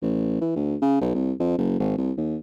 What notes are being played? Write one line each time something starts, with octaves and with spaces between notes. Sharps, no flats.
A1
E3
D2
C#3
B1
C2
F2
F#1
G#1
C2
D#2